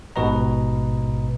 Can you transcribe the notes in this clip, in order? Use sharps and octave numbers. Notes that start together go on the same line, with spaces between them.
A1 G#2 B2 B4 D#5 A#5